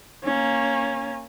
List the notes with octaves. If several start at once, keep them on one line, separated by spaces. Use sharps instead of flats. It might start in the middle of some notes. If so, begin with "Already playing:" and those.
A#3 C#4